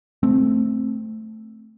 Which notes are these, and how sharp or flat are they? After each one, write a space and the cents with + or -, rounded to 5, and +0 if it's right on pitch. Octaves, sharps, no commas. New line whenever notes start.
A3 +0 C4 +5